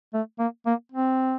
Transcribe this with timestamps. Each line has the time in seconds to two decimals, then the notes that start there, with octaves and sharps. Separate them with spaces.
0.14 A3
0.39 A#3
0.66 A#3
0.92 C4